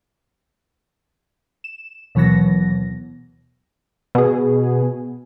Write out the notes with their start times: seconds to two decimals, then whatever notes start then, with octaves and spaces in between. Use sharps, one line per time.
1.64 E7
2.15 D#2 B2 E3 F#3 B3 A#6
4.15 B2 G#4